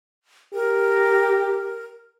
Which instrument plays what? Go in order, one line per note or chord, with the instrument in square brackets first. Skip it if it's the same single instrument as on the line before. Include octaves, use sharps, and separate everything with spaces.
[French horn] G4 [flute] A#4